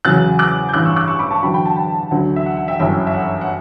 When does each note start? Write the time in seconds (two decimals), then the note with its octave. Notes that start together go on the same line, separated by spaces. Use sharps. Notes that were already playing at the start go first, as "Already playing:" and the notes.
0.05 E2 C#3 F#3 F#6 A6
0.39 D6 F#6
0.69 G6
0.73 A1 G2 E3 D6 F#6
0.85 C#6 E6
0.96 D6 F#6
1.08 C#6 E6
1.19 B5 D6
1.31 A5 C#6
1.43 E2 D3 F#3 G5 B5
1.54 G5 B5
1.65 F#5 A5
1.76 G5 B5
2.11 D2 D3 F#3
2.36 E5
2.46 F#5
2.57 F#5
2.68 E5 G5
2.80 G1 F#2 E3 E5 G5
3.07 E5
3.14 F#5
3.41 F#5